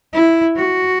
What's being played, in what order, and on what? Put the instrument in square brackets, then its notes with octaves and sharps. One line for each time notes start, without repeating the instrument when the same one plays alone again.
[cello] E4
F#4